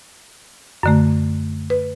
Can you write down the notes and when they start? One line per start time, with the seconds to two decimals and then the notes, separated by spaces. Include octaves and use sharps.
0.83 F#2 D3 A3
1.70 B4